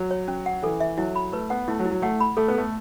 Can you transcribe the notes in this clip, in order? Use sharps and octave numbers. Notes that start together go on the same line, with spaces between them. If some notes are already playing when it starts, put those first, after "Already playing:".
Already playing: F#3
C#5
C#4
F#5
E3 A4
E5
F#3 E4
B5
A3 B4
B3 F#5
A3 E4
F#3
E4
F#3
A3 F#5
B5
A3 A4
B3
A3 A4